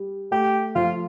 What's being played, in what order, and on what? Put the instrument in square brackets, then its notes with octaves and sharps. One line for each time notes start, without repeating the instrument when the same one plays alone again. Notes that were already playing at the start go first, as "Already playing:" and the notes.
Already playing: [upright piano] G3
[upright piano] A3 [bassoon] G4
[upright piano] F3 [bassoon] F4